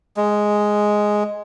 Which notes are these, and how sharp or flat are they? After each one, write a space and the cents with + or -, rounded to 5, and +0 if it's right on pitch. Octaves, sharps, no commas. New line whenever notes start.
G#3 +0